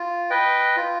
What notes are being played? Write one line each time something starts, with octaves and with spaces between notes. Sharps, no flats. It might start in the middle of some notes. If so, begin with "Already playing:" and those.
Already playing: F4
B4 D#5 G5
F4